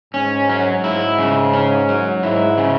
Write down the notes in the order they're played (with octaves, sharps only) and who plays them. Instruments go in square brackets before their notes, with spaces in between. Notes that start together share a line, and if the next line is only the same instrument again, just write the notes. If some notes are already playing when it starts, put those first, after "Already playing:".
[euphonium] G#2 [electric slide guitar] C#4
[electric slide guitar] F#3
[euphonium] G#2 [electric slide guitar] E4
[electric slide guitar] C#3
C#4
F#3
[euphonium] G#2 [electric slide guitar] E4
[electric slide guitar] C#3